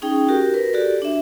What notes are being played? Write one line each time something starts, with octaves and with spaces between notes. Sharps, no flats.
C#4 D#4 G#4 G5
F#4 G4 A#4
A#4 B4
F#4 G4 A4 D5
D4 E5